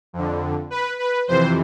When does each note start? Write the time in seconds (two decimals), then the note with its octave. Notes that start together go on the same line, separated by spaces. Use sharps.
0.13 F2 D3
0.70 B4
0.99 B4
1.28 F2 C3 E3 C5